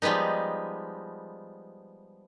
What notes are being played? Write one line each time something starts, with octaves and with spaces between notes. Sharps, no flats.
F3 G3 G#3 B3 D#4